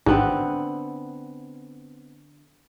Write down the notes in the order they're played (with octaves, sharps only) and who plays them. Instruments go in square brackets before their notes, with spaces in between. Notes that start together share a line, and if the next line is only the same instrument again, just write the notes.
[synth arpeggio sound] A1 G#2 [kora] D3 B3 C4